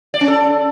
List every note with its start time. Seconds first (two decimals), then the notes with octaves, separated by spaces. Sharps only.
0.14 D5
0.21 C#4
0.28 A4